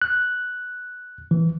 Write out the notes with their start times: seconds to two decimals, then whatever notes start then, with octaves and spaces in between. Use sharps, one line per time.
0.02 F#6
1.31 E3